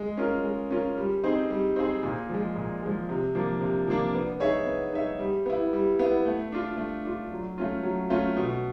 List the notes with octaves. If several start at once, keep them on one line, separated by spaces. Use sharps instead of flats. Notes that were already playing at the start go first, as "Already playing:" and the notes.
Already playing: G#3
C#4 F4 A#4
G#3
C#4 F4 A#4
G3
C4 D#4 G#4 C5
G3
C4 D#4 G#4 C5
A#2
F3 G#3
A#2
F3 G#3
C3
F3 A#3 D4
C3
F3 A#3 D4
B3
D#4 G#4 C#5 E5
B3
D#4 G#4 C#5 E5
G3
B3 E4
G3
B3 E4
A3
D4 F4
A3
D4 F4
F#3
A3 C#4 F4
F#3
A3 C#4 F4
B2